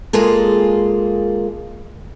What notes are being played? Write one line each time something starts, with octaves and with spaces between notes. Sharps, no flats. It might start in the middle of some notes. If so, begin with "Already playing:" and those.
G#3 A#3 F4 G#4 A4